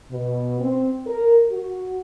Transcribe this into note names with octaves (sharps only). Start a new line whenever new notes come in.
B2
C4
A#4
F#4